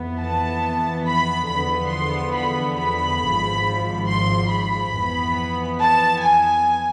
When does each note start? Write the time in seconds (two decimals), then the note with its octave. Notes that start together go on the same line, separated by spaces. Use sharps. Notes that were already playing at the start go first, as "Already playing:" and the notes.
Already playing: F2 E3 B3
0.20 A5
1.06 B5
1.49 E2 D3 F3 B3 B5
1.92 C6
2.35 B5
2.79 B5
3.21 G#1 G#2 F3
4.08 C6
4.51 B5
4.95 F2 E3 B3
5.82 A5
6.24 G#5